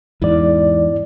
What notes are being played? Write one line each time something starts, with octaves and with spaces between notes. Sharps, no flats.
E2 G#2 E4 D5